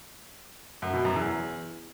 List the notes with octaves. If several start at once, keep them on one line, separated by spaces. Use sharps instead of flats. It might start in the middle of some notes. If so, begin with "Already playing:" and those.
F#2
B2
F#2
E2